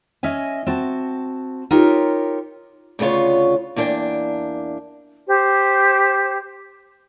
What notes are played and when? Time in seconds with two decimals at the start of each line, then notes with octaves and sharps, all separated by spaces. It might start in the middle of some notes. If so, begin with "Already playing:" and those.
0.23 C#4 D#5 E5 G#5
0.67 C4 F#4 A5
1.71 D#4 F4 G4 A#4 C#5
2.99 D2 C#3 B3 F4 C#5
3.76 E2 A#3 D4 G#4 G5
5.27 G4 C5